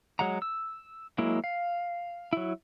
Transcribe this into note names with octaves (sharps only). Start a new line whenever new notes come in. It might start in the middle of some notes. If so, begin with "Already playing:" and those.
F#3 G#3 F#5 A#5
E6
F#3 G#3 A#3 E4
F5
F#3 E4